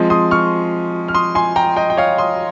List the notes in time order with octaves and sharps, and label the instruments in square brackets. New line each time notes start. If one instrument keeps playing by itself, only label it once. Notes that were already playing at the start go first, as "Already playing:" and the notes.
Already playing: [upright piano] F3 G#3 C4
C6 D#6
C#6 F6
F6
C6 D#6
G#5 C6
G5 A#5
D#5 G5
G5
C#5 F5
C6 D#6